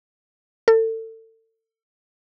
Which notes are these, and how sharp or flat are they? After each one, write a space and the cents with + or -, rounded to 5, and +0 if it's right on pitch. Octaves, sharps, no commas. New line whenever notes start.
A4 +30